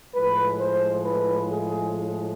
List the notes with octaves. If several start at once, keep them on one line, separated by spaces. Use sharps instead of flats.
A2 F3 G#3 B4
C5
B4
G#4